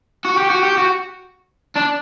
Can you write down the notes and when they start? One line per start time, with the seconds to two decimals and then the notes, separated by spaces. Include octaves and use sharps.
0.25 F#4
0.38 G4
0.50 F#4
0.63 G4
0.78 F#4
1.76 D4